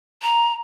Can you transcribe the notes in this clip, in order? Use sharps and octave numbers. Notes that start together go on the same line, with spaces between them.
A#5